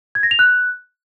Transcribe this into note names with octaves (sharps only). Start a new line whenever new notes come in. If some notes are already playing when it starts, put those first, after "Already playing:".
G#6
A#6
F7
F#6